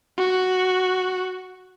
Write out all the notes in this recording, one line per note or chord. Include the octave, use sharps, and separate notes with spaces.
F#4